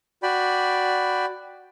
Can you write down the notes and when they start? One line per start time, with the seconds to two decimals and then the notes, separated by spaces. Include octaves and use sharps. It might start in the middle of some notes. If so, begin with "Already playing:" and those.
0.23 F#4 D5 G5 B5